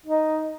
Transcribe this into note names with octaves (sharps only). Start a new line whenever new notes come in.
D#4